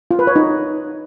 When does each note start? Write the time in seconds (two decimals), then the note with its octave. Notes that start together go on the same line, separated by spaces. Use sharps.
0.11 F4
0.19 B4
0.27 C#5
0.36 D#4